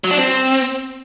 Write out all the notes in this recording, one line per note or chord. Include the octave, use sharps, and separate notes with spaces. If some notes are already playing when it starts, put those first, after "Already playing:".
F#3
D4
C4